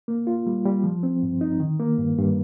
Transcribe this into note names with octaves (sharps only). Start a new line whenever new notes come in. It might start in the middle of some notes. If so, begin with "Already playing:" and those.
A#3
F4
G3
G3
F3
C4
G2
D#4
D#3
A#3
G2
G2